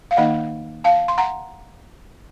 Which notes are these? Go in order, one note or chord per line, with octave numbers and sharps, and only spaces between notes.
F5
D#3 A#3 D#4 D#5 F#5
F5 A5
C6
F#5 A#5